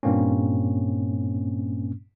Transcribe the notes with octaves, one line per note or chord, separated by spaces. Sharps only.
G2 A#2 A#3 C4 C#4